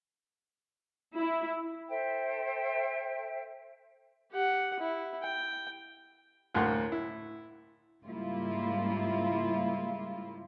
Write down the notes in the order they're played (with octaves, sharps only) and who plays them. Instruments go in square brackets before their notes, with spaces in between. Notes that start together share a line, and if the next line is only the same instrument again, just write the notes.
[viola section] E4
[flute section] A4 C5 E5 G5
[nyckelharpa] G4 F#5
E4
G5
[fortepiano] D2 A2 A#3 F#5 C6
E4
[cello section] G#2 C#3 G3 A#3 E4 F4